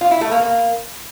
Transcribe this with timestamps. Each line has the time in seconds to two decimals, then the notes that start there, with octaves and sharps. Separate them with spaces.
0.01 F4
0.11 E4
0.21 A3
0.31 A#3
0.41 A#3